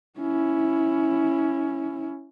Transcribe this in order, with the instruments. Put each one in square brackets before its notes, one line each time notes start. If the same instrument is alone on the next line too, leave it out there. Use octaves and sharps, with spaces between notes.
[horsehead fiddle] C#4 E4